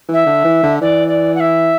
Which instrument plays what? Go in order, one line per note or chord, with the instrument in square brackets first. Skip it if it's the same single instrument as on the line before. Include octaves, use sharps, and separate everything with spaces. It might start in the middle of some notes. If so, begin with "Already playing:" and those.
[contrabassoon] E3 [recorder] E5
[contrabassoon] D3
E3
D3
[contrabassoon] E3 [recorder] D5
[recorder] D5
F#5
E5